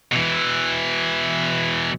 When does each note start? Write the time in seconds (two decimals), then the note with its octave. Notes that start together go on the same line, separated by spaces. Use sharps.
0.12 B2 E3